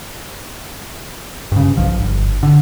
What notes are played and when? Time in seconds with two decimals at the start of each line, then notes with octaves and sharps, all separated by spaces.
1.52 G2 C#3
1.77 B1 F3
1.98 G1
2.43 D3